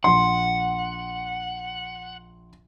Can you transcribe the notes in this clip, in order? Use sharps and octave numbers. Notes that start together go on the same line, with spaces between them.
A#1 F#5 C6